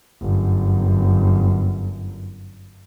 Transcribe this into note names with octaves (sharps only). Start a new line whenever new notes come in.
G1 F#2